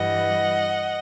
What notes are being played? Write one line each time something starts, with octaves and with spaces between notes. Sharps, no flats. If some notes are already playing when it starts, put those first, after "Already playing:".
Already playing: G2 E3 G3 D#5 F#5